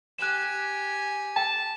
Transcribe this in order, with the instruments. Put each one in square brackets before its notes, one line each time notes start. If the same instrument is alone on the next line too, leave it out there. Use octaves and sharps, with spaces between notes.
[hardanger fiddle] G4 G#5 [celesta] F#6 E7
[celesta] G5 [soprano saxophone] A5